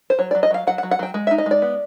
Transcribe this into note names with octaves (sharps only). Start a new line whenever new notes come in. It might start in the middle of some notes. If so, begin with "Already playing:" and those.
C5
F#3 C#5
D5
F#3
D#5
F#3 F5
F#3 F#5
F#5
F#3
F#5
F#3 G5
G#3
E5
D#4
D#5
G#3 D5
B3